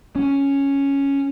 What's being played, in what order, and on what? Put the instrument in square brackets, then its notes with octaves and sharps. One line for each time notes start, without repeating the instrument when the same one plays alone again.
[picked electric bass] C#4